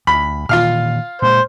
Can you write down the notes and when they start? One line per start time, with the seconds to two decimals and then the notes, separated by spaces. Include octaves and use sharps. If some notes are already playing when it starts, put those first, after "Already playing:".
0.07 D2 B5
0.49 A#2 D#3 E3 F4 F5 F6
1.22 A#2 G#3 C5